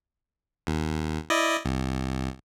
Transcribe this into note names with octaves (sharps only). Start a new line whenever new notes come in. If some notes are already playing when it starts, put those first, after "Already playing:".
D#2
E4 D5 D#5
C2